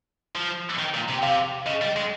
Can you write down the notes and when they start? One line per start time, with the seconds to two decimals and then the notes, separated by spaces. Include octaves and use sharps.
0.35 F3
0.78 D#3
0.94 A#2
1.08 C3
1.19 G5
1.22 C3 F5
1.62 F5
1.66 C#3 D#5
1.82 G3
1.96 G#3